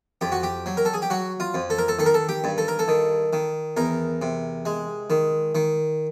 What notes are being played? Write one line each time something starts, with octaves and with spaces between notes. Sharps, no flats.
F2 G4
F#4
G4
F#3
A#4
A4
G#4
G4
F#3 F#4
F4
F2
A4
A#4
A4
D#3 A4
A#4
A4
G4
G2
A4
A#4
A4
D#3
D#3
E2 A#4
C3
G#3
D#3
D#3